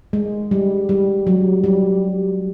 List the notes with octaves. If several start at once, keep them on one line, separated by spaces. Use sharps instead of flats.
G#3
G3
G3
F#3
G3